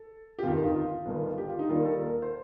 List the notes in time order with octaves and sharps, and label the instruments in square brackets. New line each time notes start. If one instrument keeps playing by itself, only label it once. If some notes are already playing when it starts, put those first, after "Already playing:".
Already playing: [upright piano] A4
G4
[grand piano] G1 F2 D#3 [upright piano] F4
[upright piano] F4
D#4
F4
[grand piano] G1 G2 D#3
[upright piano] G4
F4
D#4
[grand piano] D#2 D#3 G3 D4 [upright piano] F4
[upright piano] A4
A#4
A#4
C5